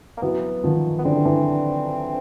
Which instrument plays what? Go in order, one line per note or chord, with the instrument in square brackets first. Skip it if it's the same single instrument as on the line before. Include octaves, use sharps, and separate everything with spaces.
[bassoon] A#3
[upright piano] E3 F#3 [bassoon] B3
[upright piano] D#3 F3
[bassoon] B3
[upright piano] D3 E3 [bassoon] C4
[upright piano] E3